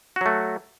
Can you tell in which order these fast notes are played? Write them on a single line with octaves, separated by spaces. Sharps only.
F#4 F#3 A3